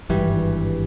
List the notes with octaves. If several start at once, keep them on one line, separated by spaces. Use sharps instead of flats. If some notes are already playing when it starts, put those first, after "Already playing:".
G#1 G2 E3 G3